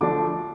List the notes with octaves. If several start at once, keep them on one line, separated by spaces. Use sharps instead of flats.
D3 F3 A3 D4 D6